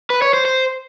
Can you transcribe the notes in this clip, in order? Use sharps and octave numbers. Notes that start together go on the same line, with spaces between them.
B4
C#5
C5
C5